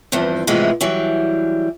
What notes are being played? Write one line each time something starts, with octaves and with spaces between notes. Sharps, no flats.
E2 G2 F3 C4
A2 C3 E3 F3 G#3 B3
E3 F#3 G3